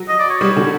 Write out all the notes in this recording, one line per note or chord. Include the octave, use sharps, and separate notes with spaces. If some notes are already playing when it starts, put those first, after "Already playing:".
Already playing: F#3
D#5
D5
C#5
G3
D3